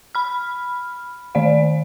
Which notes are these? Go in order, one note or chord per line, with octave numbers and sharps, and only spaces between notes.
B5 F6
D#3 D5 F5